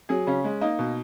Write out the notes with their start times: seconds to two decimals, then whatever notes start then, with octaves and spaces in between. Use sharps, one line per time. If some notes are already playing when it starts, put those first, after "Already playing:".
0.09 F#3 G#4
0.27 C#3 C#4
0.44 G#3
0.61 A#3 D#4
0.79 B2